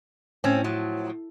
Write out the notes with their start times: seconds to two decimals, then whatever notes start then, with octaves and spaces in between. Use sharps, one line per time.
0.44 A2 C4 C#4
0.64 F3 F#3